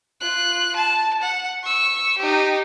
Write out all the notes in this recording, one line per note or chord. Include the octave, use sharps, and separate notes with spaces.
F4 F#6
A5
F#5
C#6 E6
D#4 G4